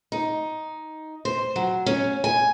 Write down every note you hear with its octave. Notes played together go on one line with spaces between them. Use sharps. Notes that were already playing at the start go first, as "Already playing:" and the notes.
D#4
C5
F#3
C#4
G#5